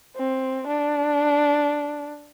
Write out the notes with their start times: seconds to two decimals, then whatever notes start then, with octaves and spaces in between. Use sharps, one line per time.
0.17 C4
0.68 D4